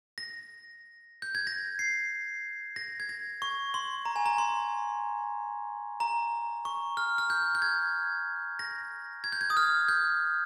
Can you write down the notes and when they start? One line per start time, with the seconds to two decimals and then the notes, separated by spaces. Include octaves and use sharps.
0.18 A#6
1.22 G6
1.35 G#6
1.47 A#6
1.79 C7
2.76 A#6
3.00 G#6
3.09 A#6
3.42 C#6
3.74 C6
4.05 A#5
4.16 G#5
4.26 A#5
4.38 C6
6.00 A#5
6.65 C#6
6.97 F6
7.18 F6
7.30 G6
7.55 G6
7.62 G#6
8.59 A#6
9.24 G#6
9.32 G6
9.41 G#6
9.50 D#6
9.57 F6
9.89 G6